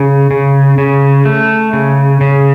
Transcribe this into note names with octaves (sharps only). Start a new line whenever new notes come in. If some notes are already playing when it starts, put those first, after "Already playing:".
Already playing: C#3
C#3
C#3
A3
C#3
C#3